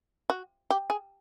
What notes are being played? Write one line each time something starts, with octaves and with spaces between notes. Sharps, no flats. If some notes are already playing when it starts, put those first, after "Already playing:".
F#4
G4
G#4